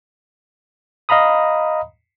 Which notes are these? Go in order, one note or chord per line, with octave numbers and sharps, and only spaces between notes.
D#5 F5 A#5 B5 D#6